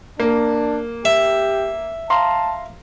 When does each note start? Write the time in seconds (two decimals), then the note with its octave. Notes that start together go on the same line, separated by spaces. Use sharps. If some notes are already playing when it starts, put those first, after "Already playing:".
0.20 A#3 D4
1.05 G4 E5
2.10 F5 A5 A#5 C6